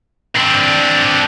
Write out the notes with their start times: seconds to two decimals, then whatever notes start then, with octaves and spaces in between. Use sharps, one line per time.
0.35 C4 D4